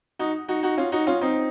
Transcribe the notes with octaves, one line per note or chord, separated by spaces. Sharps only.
D#4 F#4
D#4 F#4
D#4 F#4
C#4 F4
D#4 F#4
C#4 F4
C4 D#4